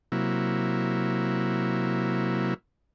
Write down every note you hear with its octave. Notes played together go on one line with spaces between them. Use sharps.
C3 F#3 A#3 E4